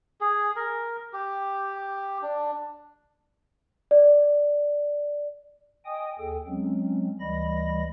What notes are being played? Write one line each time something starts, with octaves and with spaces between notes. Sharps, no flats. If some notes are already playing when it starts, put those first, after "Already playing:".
G#4
A#4
G4
D4
D5
D#5 G5 G#5 D#6
D#2 G#4 A4 G5
F#3 G#3 C4 C#4
D2 E3 G3 D#5 B5 A#6